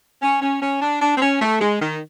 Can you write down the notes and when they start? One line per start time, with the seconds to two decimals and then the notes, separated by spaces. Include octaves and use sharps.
0.22 C#4
0.42 C#4
0.62 C#4
0.82 D4
1.02 D4
1.18 C4
1.22 C#4
1.42 A3
1.61 G#3
1.81 D#3